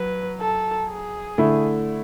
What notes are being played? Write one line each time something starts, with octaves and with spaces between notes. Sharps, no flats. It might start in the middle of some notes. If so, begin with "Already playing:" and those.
Already playing: F#3 B4
A4
G#4
D3 A3 E4